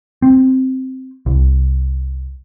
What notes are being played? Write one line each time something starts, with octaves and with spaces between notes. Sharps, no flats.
C4
C2